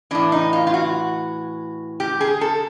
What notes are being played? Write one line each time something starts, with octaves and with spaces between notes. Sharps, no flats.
A2 E3 D4
D#4
F4
F4
F#4
G4
G#4
A4